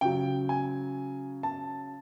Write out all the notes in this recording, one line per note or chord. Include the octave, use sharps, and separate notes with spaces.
C#3 F#3 G5
G#5
A5